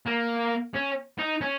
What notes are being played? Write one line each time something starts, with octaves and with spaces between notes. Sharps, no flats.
A#3
C#4
D#4
C#4